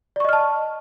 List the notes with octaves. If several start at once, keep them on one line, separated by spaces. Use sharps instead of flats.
D5 D#5 A5 C#6 F6